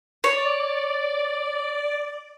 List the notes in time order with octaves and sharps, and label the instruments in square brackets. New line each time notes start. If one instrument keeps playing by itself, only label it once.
[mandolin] C#5 [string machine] D5